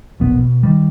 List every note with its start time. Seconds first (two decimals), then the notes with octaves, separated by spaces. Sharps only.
0.20 E1 A#1 B3
0.40 B2
0.63 D#3 G3